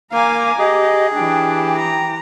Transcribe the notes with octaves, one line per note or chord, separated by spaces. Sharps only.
A#3 F5 G#5 A#5 D6
G4 G#4 D#5
E3 D4 G4 G5
A#5